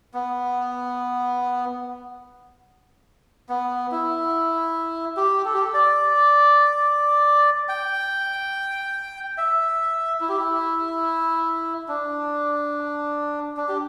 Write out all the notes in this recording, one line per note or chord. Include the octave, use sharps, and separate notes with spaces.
B3
B3
E4
G4
A4
G4
A4
D5
G5
E5
E4
G4
E4
D4
D4
G4